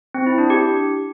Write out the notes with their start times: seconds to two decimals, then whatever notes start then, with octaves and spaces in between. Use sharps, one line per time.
0.14 C4
0.26 E4
0.38 D4
0.50 G4